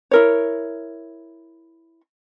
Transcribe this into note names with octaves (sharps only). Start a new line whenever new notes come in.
E4 A#4 C#5